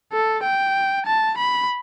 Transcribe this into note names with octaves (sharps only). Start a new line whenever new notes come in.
A4
G5
A5
B5